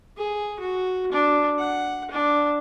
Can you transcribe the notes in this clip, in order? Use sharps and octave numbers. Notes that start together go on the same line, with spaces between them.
G#4
F#4
D4
F#5
D4